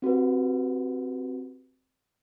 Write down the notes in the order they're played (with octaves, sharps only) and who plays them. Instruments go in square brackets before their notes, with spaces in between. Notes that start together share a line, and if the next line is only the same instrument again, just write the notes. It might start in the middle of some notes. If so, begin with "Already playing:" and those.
[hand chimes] C4 F#4 G4 B4